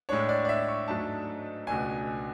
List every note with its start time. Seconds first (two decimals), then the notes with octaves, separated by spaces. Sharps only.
0.09 A2 G#3 D4 C#5
0.29 D5
0.45 D5
0.49 E5
0.69 C#6
0.88 G#2 F#3 A3 D4 A5
1.67 C#2 B2 A3 D4 G#5